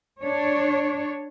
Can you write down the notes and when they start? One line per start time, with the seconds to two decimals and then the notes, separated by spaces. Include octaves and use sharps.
0.21 D4 C#5